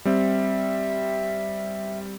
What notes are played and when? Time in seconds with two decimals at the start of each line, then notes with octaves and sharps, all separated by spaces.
0.05 G3 C4 E5